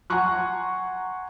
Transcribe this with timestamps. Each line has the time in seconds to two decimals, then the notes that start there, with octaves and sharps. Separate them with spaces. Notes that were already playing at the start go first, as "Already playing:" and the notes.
0.10 F#5 G#5 A#5 C6 C#6 F#6